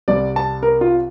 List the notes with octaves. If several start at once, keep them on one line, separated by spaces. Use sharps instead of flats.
C2 C3 G3 D5
A5
A#4
F4